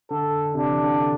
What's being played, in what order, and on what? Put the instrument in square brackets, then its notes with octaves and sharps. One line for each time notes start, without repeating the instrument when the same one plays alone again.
[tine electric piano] D3 [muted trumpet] A4
[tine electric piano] C3 [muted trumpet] D4
[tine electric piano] E3
D3